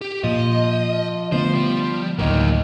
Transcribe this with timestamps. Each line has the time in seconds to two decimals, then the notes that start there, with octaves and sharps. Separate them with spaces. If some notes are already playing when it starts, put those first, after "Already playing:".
0.01 G4
0.24 A#2 F3 D#5
1.32 D3 F3 A3 B3 C5
1.55 G3
2.19 A1 D2 D#3 F#3 A#3 D#4